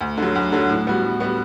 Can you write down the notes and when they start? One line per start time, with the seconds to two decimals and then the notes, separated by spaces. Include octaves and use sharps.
0.01 D2
0.18 D3 F#3
0.35 D2
0.52 D3 F#3
0.69 A2
0.87 G3 B3 F#4
1.03 A2
1.20 G3 B3 F#4